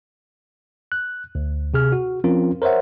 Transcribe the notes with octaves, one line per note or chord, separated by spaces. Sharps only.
F#6
D2
C3 G#4 F6
F#4
F3 C4 C#4 F4 A#4
A#4 C5 C#5 E5 F#5